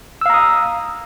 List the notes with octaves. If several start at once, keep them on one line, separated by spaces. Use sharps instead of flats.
F5 A#5 D#6 E6